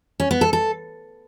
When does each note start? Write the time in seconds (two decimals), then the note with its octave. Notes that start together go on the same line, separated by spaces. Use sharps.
0.20 C#4
0.31 B3
0.41 A4
0.53 A4